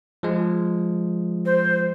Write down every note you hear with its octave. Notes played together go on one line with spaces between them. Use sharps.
F3 G#3
C5